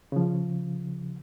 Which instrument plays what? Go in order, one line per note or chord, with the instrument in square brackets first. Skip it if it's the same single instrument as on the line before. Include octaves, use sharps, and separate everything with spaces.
[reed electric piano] C#3 F3